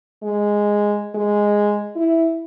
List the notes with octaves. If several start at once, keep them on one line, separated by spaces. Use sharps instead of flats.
G#3
G#3
E4